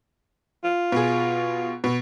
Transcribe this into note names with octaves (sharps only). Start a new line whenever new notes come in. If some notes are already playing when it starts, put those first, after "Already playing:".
F4
B2 G#4
B2